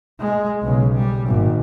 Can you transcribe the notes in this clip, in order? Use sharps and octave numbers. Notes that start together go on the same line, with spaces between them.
G#3
B1 C#3
G3
G#1 A#2